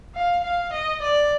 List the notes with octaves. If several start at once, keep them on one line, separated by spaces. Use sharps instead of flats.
F5
F5
D#5
D5